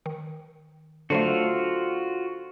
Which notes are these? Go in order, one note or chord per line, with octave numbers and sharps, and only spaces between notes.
D#3
D3 F#3 A3 D4 F4 F#4 A4 C5